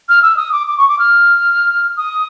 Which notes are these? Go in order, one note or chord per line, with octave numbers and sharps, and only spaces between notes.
F6
E6
D#6
D6
D6
C#6
D6
F6
D#6